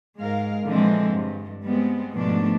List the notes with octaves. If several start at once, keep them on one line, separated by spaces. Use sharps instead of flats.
G#2 G#3 A#4 F5
A#2 D3 E3 F3 G#3 C4
G2
G3 G#3 B3 C4
G#2 B2 D#3 F3 A3 D4